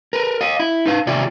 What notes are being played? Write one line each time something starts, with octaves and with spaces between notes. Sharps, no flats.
A#4 B4
D#5 F5
E4
D#4 B4 F5
D#2 C3 F4 D5 E5